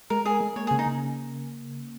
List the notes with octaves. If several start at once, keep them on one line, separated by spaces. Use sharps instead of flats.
G#3 A#4
G#4 A#4
G#3
A#3 C#5
G#4
C#3
D#4
C#3